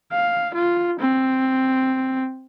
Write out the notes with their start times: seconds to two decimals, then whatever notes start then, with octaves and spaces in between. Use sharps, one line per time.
0.12 F5
0.54 F4
0.99 C4